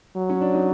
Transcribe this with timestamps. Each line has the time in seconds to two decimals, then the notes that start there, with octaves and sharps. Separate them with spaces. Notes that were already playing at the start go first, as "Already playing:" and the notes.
0.17 F#3
0.29 C#4
0.41 D4
0.53 C#4 D#4